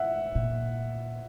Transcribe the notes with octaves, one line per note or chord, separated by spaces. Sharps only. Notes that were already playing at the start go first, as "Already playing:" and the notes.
Already playing: E5 F#5
A#2